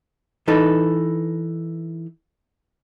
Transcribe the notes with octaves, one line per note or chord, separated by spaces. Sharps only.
E3 D#4 A4 B4